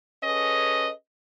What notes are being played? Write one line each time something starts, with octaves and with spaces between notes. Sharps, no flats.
C#4 G#4 A4 B4 D#5